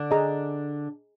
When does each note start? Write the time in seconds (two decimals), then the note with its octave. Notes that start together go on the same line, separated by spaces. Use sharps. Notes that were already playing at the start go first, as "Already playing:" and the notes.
Already playing: D3 D4
0.11 G#4 D#5 A#5